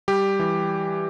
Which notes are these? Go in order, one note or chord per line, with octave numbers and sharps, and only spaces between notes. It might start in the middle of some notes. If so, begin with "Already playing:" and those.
G3 G4
E3